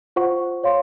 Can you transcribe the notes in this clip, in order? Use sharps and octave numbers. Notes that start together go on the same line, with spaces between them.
F4 C5 F#5 C#6
C#5 F5 C6